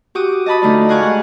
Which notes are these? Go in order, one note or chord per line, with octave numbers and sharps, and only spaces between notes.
F#4 G4 D6 D#6
D#5 A5 B5 D#6
D3 A3 D4 D#4 F4 D5
D#5 F5 F#5 G#5 C#6 D6
G#2 F#5 F#6